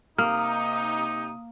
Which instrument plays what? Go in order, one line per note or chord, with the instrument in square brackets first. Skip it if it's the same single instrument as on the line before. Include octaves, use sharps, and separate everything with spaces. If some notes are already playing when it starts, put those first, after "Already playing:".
[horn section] C3 D#4 [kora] A#3 [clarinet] D#6 [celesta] F6